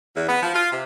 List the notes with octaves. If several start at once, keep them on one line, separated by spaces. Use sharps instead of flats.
E2
B3
F3
F4
C3